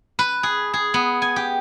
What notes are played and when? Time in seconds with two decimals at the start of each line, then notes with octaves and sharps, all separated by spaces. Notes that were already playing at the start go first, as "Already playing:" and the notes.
0.19 B4
0.43 G#4
0.74 G#4
0.94 B3
1.22 G#5
1.36 G4